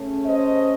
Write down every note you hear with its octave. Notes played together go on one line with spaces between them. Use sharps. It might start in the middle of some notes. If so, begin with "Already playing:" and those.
Already playing: C#3 A3 C#4
C5 D#5